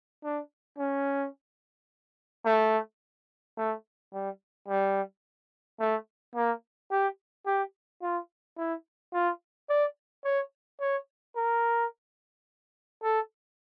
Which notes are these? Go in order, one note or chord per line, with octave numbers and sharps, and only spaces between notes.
D4
C#4
A3
A3
G3
G3
A3
A#3
G4
G4
F4
E4
F4
D5
C#5
C#5
A#4
A4